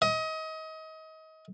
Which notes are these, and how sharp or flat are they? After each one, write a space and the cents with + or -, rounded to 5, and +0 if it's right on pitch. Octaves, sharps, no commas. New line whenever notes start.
D#5 +30